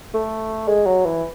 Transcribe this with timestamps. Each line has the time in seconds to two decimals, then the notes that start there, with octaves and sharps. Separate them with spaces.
0.14 A3
0.68 G#3
0.86 F#3
1.05 E3